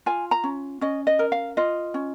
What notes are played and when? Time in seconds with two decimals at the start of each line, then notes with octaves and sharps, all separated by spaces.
0.06 F4 G#5
0.31 A#5
0.44 C#4
0.81 C#4 D#5
1.07 D#5
1.19 A#4
1.32 F5
1.57 F4 D#5
1.94 C#4